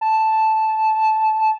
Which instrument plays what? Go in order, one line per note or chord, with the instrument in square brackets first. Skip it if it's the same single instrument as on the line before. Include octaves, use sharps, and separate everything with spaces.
[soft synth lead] A5